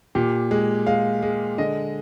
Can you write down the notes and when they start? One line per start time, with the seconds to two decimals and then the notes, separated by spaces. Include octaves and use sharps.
0.15 A#2 G4
0.51 G#3
0.87 G#3 F5
1.23 G#3
1.58 D3 D#5